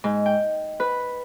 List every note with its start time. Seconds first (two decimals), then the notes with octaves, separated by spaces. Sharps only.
0.04 G#2
0.26 G5
0.80 B4